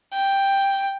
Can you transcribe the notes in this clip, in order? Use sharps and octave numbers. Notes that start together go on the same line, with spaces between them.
G5